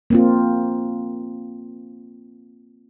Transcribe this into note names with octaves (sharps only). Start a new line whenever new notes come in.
A#3 C4 F4